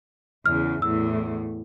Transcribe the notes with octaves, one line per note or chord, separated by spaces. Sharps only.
E2 C#3 F6
E2 A2 E6